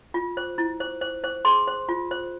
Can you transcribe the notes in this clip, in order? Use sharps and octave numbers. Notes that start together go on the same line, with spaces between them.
F4
C5
E4
C5
C5
C5
G#4 C6
C5
F4
C5